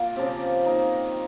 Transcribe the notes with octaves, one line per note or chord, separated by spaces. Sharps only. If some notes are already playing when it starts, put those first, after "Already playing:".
Already playing: A#3 F4
C#3 F3 C4 G4
D#3 A#3 D#4